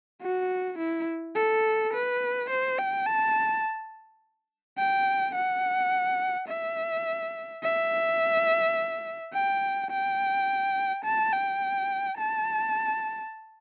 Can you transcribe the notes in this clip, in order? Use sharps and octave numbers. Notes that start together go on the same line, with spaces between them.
F#4
E4
A4
B4
C5
G5
A5
G5
F#5
E5
E5
G5
G5
A5
G5
A5